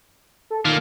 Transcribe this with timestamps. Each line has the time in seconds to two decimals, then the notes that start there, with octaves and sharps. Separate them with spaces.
0.50 A4
0.65 D#3 A#3 F4